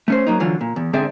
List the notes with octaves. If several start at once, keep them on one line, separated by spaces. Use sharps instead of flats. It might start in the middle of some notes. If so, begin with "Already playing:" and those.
A3 C#4 C5
F#3 A#3 D#4
D3 E3 F#3 F4
A#2
E2
G#2 D3 C4 G#4 D5 E5